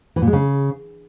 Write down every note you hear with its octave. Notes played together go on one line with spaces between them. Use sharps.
E3
A#2
G#3
C#3